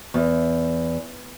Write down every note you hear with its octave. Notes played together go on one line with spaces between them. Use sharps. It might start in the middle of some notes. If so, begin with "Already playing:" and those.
E2